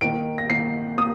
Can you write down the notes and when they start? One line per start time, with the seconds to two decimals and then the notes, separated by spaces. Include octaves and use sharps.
0.01 D#3 A#3 D7
0.38 A#6
0.50 D#3 A#3 C7
0.98 A#3 D#6